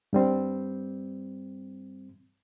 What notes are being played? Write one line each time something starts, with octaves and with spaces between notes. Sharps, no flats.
G2 G3 C4